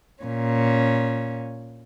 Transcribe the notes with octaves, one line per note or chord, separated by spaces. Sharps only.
A#2 C#4